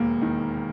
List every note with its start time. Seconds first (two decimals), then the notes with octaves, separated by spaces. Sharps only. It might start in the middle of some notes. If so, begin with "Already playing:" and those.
Already playing: E1 D#2 A#3
0.22 D#3